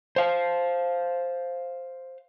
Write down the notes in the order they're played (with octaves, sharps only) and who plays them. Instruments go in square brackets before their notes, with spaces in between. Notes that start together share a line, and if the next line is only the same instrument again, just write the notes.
[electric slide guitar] C5 F5